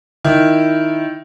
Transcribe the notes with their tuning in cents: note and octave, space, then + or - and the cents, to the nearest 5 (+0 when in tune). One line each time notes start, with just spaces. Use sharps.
D#3 +0 E4 +5